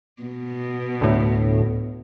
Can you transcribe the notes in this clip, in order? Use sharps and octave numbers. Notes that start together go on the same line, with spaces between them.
B2
D2 A2